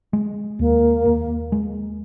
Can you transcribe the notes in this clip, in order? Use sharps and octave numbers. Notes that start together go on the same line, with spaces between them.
G#3
D#2 A#3
D#2
G#3